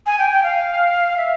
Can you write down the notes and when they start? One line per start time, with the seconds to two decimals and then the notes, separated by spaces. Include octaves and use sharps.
0.06 G#5
0.19 G5
0.31 G5
0.43 F5
1.17 E5